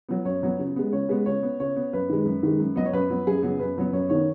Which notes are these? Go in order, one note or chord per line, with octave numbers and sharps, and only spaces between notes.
F#3 B3
F#2 C#5
F#3 B3
C#3
G#3 B3
C#3 C#5
G#3 B3 B4
C#3 C#5
B3
C#3 C#5
B3
F#2 B4
D#3 G#3
F#2
D#3 G#3
F#2
F#3 B3 D#5
C#5
F#2 B4
F#3 B3
F#2 G#4
C#3 F#3 B3
F#2 B4
C#3 F#3 B3
F#2 C#5
D#3 B3 C#5